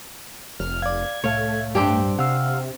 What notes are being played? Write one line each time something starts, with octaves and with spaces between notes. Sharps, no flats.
F1 F6
D5 F5 G#6
C2 A2 A3 C#5 F5
G2 C4 D4 G4
C3 F5 F#5 E6